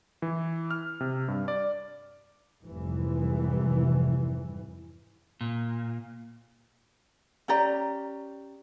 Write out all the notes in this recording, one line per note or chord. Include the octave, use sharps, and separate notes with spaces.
E3
F6
C3
G2
D5
F1 G#2 C3 E3 G3
A#2
C#4 G4 D5 A#5